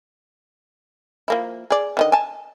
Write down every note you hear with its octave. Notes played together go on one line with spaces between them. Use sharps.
F3 A#3 E4
G#4 D5
D3 D#3 D#5
G#5 A5